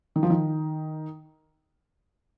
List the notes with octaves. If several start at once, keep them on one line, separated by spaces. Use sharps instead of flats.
D#3
F3
D#3